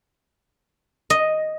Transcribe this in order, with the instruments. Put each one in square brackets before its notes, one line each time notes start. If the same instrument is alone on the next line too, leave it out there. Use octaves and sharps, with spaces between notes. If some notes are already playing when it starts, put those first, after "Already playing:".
[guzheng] D#5